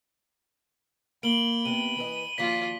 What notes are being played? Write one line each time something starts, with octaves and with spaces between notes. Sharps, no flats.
A#3 B5 D7 F#7 G7
C3 B3 D#7
E3 B4 D#5
D#2 F3 F4 F#4 D5 B6